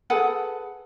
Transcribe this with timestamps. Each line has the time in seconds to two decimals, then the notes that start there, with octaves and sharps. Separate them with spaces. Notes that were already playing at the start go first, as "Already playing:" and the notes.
0.10 G#4 A4 B4 F#5